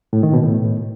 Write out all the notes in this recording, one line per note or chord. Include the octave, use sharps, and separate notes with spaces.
A2
D#3
B2
A2